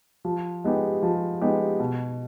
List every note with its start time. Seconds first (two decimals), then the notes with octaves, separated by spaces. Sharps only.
0.25 F3
0.64 G#3 B3 D#4 G4
1.03 F3
1.41 G#3 B3 D#4 G4
1.80 B2